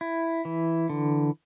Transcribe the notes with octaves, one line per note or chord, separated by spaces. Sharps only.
E4
E3
D3